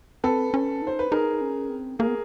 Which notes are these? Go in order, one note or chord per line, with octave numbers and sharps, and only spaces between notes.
C4 A4 B4
C#4
D#4 C5
B4
D#4 G#4 A#4
C#4
C4
A#3 G#4 A#4
B3